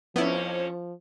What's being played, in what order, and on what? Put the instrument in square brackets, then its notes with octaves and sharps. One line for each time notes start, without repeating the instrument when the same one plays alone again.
[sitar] F2 C#4 [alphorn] F3 [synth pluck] B3 E4